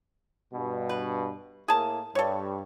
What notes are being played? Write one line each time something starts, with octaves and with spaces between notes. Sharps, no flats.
G2 B2
B4
A2 A#3 G#4 A5
G2 A4 C#5